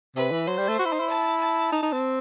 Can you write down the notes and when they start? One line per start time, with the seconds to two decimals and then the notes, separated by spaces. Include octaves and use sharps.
0.16 C3 B4
0.31 E3
0.47 F#3 C5
0.58 G3
0.68 A3
0.79 F#4
0.85 E4
0.93 D#4
1.00 E4
1.10 A5
1.41 A5
1.72 D#4
1.83 D#4
1.93 C4